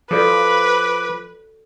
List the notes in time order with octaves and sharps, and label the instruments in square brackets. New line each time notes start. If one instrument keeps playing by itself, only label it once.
[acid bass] F3 [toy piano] F#4 A4 D5 [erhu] B4 [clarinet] D6